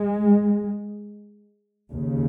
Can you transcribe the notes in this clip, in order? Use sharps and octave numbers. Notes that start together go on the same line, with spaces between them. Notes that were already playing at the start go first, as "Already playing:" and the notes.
Already playing: G#3
D#2 C#3